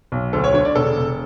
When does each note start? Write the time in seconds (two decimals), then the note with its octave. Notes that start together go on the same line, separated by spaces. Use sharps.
0.12 B1
0.33 D2 A4
0.44 C#5
0.54 D3 C#5
0.65 D5
0.75 E1 A4
0.97 E1